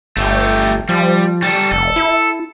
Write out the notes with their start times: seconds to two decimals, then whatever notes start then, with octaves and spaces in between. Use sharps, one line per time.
0.17 G1 A3 G4
0.89 F3 G3
1.42 G3 A4
1.72 F1 A4
1.96 E4